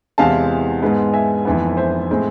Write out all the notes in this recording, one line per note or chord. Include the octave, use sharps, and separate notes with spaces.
E2 C3 E3 G#3 F5 A5
G#2 G#3 B3
E5 G#5
F1 F2 E3 B3
C5 E5
A2 G#3 C4